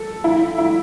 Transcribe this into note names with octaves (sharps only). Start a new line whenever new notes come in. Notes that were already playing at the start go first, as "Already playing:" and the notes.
Already playing: A4
E4
E4